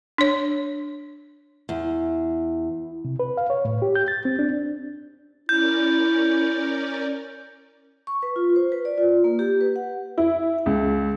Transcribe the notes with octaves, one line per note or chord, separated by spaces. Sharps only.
D4 C#5
E2
C3
B4
F5
C#5
A2
G4
G6
A6
C4
D4
C#4 E4 A#4 D5 G6
C#6
B4
F4
C5
B4
D5
F4
A#3
G4
B4
F#5
E4
C#2